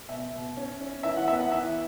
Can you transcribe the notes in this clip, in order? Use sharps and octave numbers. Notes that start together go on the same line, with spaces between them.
B2 E5
B2
C#4
C#4
E3 E5
F#5
B3 E5
F#5
E3 E5